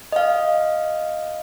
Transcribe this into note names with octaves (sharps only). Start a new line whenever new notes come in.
D#5 F5